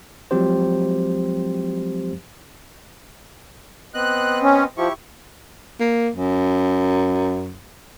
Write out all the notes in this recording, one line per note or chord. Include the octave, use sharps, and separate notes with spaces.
F3 F#3 G#3 C4 G4 C5
B3 C4 D#5 F#6
C#4
F3 E4 G4 C#6
A#3
F#2